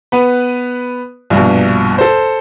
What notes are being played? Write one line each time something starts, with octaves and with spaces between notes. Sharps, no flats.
B3 B4
A#1 G2 B2
A4 C5